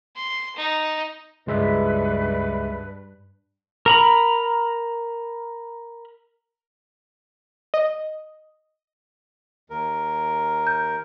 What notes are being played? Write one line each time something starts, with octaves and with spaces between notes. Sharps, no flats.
C6
D#4
C#2 G2 G#3 B4 E5
A#4 A#5 B5
D#5
D#2 A#4
G6